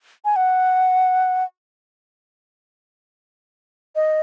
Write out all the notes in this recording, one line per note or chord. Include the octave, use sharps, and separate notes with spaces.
G#5
F#5
D#5